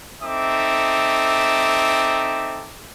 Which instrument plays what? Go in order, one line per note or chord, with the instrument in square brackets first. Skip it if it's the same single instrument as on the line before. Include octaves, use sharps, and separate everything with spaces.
[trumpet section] C4 D#4 A4 E5 D6